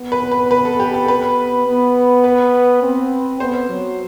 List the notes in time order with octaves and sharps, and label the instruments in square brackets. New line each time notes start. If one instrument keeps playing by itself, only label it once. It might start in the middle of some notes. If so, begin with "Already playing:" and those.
Already playing: [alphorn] B3
[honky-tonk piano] B4
B4
B4
A4
G4
A4
B4
[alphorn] B3
[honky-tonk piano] B4
[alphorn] C4
[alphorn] B3 [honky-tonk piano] C5
[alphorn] F#3